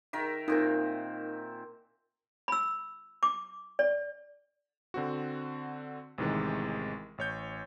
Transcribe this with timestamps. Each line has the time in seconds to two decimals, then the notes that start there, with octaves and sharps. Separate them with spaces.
0.13 D#3 A#4 E5
0.48 A#2 C4 D#4 A#4
2.48 B5 E6
3.23 D6
3.79 D5
4.94 D3 C4 F#4
6.18 A1 C3 D#3 E3 G#3
7.18 A1 C#5 G6